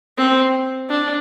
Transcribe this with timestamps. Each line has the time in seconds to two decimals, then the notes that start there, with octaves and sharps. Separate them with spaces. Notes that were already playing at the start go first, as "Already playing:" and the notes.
0.18 C4
0.89 D4